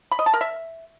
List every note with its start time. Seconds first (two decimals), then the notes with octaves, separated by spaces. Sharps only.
0.12 B5
0.19 D#5
0.26 A5
0.34 A#4
0.41 E5